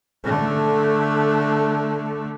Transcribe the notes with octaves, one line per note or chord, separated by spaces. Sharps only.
D3 A3